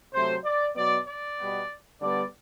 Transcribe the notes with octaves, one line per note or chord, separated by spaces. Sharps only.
C3 F#3 A3 C5
D5
B2 F#3 B3 D5
D5
B2 G3 B3
D3 G3 B3 D5